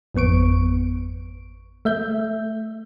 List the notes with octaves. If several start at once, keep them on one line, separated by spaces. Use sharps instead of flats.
G#1 F2 B3 C#6 D7
A3 E5 G6